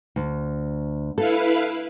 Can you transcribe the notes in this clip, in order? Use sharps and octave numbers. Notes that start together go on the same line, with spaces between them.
D2
E4 A4 B4 F5